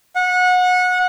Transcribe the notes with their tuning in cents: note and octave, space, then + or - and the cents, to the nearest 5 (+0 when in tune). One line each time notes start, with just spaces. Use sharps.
F#5 -25